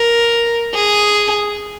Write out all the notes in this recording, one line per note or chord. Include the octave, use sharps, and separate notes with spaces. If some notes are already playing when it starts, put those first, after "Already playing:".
Already playing: A#4
G#4